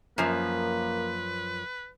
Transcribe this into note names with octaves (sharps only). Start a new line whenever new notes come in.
F#2 F3 A#3 B4